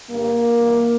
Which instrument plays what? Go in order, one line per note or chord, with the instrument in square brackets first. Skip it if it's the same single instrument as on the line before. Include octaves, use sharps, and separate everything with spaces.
[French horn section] G2 D3 G3 A#3
G2 E3 G3